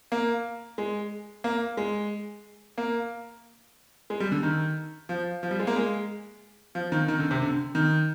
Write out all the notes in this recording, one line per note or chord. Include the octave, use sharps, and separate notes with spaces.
A#3
G#3
A#3
G#3
A#3
G#3
G3
D3
D#3
F3
F3
G3
G#3
A#3
G#3
F3
D#3
D#3
D3
C3
D3
D#3